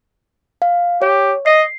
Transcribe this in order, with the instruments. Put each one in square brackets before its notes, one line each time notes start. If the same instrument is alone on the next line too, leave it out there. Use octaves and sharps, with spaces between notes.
[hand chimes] F5
[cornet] G4 [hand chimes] C#5
[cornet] D#5 [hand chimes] C7